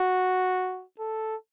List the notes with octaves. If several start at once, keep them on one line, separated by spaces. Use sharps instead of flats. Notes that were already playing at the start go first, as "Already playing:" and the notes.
Already playing: F#4
A4